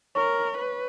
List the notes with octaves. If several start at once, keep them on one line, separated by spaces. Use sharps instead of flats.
A#4 C#5 C#6
B4